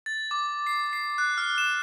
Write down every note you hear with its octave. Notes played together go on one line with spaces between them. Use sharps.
A6
D6
C7
C7
F#6
F6
E7